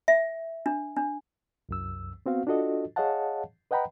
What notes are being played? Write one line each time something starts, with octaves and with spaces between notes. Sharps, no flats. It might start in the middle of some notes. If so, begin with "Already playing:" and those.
E5
D4
D4
C2 F#2 E6
B3 C4 F#4 F5
D4 F4 F#4 A4 D#5
G#4 C#5 D#5 F5 F#5 A5
B4 D#5 F#5 G5 A#5 B5